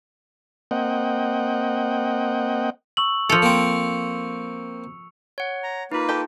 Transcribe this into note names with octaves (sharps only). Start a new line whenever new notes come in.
A#3 C4 D#5 F#5 G5
C#6 E6 F#7
F3 A4 C#7 F7
A#3 C4
C#5 F#5
A#5
A#3 D#4 F4 B4
G4 A4 A#5